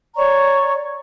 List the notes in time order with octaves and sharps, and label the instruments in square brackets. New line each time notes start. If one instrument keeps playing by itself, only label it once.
[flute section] C#5 D5 A#5 C#6